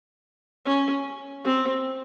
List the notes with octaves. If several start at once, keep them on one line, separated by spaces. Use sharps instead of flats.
C#4
C4